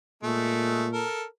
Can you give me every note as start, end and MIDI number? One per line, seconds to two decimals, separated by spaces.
0.23 1.03 46
0.23 0.87 56
0.23 0.87 57
0.93 1.24 69
0.93 1.24 70